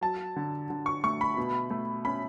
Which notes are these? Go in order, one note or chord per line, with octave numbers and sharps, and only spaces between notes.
F#3 A5
D3
D3
C#6
A3 C#6
B5
B2
A3
C#4 B5